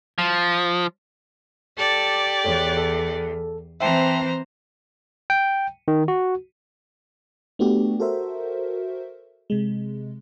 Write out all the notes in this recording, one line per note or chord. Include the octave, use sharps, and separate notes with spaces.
F3
G4 A4 D5
E2 A4 C#5
A4
E3 C4 C5 E5 G5 A5 A#5
G5
D#3
F#4
A3 B3 D4 F#4 G4
F#4 A4 A#4 C5 E5
C3 G#3